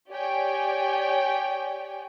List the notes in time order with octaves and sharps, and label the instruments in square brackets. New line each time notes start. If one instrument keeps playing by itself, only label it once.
[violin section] G4 C#5 D5 G5 G#5